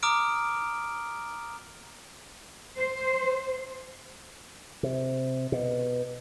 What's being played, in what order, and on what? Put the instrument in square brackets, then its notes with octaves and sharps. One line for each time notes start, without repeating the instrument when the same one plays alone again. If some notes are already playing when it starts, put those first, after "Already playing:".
[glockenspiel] A#5 D6 D#6 F6 D7
[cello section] C5
[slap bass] C3
B2